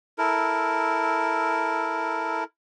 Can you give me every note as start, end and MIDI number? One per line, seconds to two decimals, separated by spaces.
0.18 2.44 64
0.18 2.44 69
0.18 2.44 70